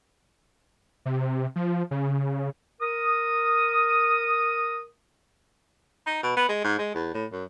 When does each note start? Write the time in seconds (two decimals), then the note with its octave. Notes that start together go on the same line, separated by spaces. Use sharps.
1.06 C3
1.56 F3
1.91 C#3
2.81 A#4 D#6
6.07 D#4
6.23 B2
6.37 B3
6.49 G#3
6.64 G#2
6.78 G#3
6.95 E2
7.14 A2
7.32 F#2